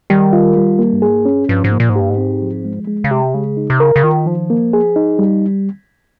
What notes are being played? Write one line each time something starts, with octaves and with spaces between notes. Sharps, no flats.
D#3 G3
F4
G3
A#3
G2
G#2 G#4
G2 C#4
G2 F3
G#2
A#3
A#2
G#2
G2 G4
G#2
C4
F3
G#3
G#3
C#3
C3 G4
C#3 G#3
D#4
C3
C#3 A#4
C#3
D#3 F4
D#3 F3
A#3
G#4
D#4
G3